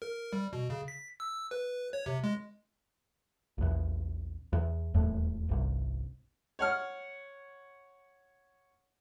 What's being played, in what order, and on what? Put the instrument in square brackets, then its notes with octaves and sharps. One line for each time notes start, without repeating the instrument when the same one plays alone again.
[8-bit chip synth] A#4
G3
B2
C#3
B6
E6
B4
C#5
C3
G#3
[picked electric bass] A#1 E2
E2
D#1 E2 A2
G1 C2
[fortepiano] C#5 F#5 F6